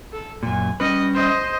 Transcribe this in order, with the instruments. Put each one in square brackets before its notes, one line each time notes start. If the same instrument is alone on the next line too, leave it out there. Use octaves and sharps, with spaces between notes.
[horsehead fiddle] A4
[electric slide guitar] F#2 A#2 [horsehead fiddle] G#5
[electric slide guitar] G3 C#4 B4 [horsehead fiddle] D#5
[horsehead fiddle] C5 D#5